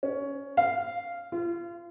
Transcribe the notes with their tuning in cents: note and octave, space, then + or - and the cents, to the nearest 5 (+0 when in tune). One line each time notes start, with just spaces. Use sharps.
C#4 +10
F5 -10
F4 -35